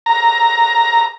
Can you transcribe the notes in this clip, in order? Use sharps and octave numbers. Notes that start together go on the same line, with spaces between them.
A#5